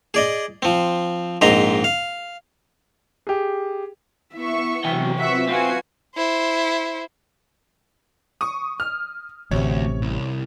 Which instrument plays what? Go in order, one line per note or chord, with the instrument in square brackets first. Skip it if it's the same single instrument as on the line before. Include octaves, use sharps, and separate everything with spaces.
[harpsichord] G#4 D5 D#5
F3 C4
A#1 G#2 C4 C5 D#5 A#5
F5
[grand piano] G4 G#4
[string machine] B3 [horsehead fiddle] E4 [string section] E5 C#6
[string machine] C3 F#3 F#4 [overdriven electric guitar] E3 G5
[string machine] C4 F4 B4 [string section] E5 C#6 [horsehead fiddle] F#5
[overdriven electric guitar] C4 C5 [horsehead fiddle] F4 B4 [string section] F#4 G#5 [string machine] G#6 C7
[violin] E4 C5
[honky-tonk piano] C#6 D#6
F6
[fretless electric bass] A1 C3 [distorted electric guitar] D2 [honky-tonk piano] C#5
[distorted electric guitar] C2